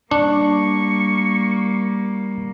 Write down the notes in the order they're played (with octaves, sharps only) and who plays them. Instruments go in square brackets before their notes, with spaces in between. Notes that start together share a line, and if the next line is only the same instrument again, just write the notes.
[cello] G3 A#3 [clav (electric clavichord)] D4 [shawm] C#6